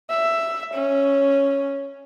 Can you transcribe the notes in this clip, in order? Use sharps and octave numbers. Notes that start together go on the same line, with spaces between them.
E5
C#4